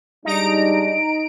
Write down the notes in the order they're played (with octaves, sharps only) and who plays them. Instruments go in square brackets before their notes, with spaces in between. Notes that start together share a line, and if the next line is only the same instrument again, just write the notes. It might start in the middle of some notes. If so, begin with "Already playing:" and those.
[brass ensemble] G3 G#3 D4 [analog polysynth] D#4 A#5 D7